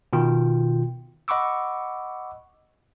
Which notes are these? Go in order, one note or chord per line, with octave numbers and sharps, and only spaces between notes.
B2 D#3 F4 G5
D#5 F#5 B5 C#6 D6 E6